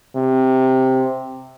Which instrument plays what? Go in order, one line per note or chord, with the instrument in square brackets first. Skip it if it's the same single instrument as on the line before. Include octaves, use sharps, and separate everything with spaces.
[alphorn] C3